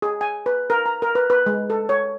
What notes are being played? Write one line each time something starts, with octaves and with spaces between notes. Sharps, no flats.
G#4
G#5
B4
A#4
A#5
A#4
B4
B4
G#3
A4
C#5